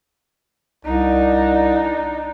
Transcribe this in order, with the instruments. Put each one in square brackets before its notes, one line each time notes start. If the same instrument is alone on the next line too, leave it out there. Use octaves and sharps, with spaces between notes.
[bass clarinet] C2 [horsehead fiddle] D4 D#4